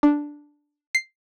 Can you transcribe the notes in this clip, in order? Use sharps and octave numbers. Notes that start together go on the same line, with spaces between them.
D4
C7